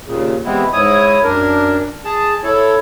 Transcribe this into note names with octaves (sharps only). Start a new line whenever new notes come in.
D#2 A#2 C#3
E3 G3 G#3 B3 C4 E4
G#2 E4 C#5 D#6
F#2 D4 A#4
G#4 A5
E4 A4 C#5